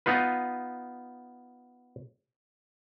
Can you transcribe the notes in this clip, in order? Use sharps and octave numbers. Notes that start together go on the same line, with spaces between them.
B3 D#4 F4 B4